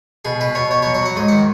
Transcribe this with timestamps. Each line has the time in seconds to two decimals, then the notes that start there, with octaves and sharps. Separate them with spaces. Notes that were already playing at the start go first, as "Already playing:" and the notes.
0.25 B2 G#4
0.40 B2 B4
0.55 B2 C#5
0.71 B2 C#5
0.82 C#5
0.86 F#3
0.94 C#5
1.02 F#3 F#5
1.16 G#2 D#5
1.28 D#3 F#5